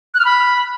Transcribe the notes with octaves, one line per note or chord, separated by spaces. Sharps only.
F#6
F6
B5